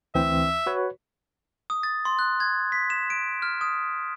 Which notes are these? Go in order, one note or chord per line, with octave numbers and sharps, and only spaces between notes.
D2 E3 C4 E5
F#4 B4 C#5
D#6
A6
C6
F#6
G#6
B6
E7
D7
F6
D#6